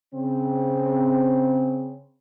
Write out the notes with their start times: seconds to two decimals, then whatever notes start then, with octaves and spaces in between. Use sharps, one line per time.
0.14 C#3 C4